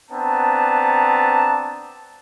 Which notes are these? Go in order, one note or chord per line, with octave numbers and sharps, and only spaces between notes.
B3 C4 D4 A5 A#5